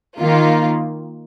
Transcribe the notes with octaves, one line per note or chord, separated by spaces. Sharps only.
D#3 A#3 F4